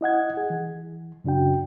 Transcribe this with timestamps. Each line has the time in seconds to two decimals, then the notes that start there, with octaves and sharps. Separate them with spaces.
0.01 E4 D#5 F#5 G#6
0.37 G#4
0.50 E3
1.24 F#2 C#3 D4 F#4 G5